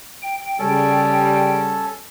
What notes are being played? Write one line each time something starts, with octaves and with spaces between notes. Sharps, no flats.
G5
C#3 G3 C#4 A4